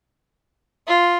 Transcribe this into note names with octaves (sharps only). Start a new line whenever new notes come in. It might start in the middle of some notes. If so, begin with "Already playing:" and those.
F4